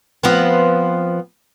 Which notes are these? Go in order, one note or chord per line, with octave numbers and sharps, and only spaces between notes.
F3 B3 C4